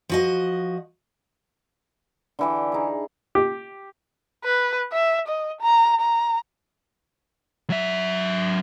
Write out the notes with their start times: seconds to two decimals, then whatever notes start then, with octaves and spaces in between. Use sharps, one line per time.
0.09 F3 F#4 D#5
2.39 D3 E3 G4
2.72 D#4 G#4
3.35 G4
4.44 B4
4.93 E5
5.28 D#5
5.61 A#5
6.01 A#5
7.70 F#3 E5